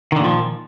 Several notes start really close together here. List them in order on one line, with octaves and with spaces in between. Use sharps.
D#3 D3 A#2 F3